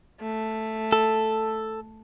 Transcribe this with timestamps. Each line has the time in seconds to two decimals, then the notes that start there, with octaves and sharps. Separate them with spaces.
0.21 A3
0.93 A4